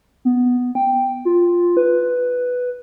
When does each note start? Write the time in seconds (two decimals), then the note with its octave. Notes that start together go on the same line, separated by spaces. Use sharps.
0.25 B3
0.75 G5
1.25 F4
1.77 B4